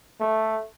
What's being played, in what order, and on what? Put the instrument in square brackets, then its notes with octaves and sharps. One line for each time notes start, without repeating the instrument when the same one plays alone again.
[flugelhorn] A3